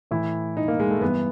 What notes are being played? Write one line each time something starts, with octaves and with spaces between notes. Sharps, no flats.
A2 E3 E4
D#4
A#3
G#3
A3
G2 E3 B3